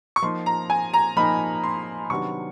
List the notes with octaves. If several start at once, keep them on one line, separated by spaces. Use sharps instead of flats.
C#6
F3 A#3 D#4 C6
A#5
G#5
A#5
F3 A#3 D#4 B5
C6
C3 D#3 F#3 B3 D4 C#6